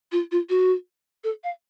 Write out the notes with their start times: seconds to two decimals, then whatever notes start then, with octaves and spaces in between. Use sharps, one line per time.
0.12 F4
0.31 F4
0.49 F#4
1.24 A4
1.44 F5